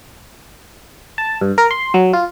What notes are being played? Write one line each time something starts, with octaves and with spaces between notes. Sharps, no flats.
A5
G2
A#4
C6
F#3
F4